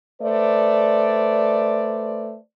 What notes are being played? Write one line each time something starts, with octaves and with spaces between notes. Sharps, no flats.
A3 B4 C5 D5